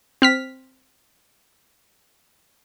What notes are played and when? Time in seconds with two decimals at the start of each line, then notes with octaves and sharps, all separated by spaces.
0.22 C4 F6 B6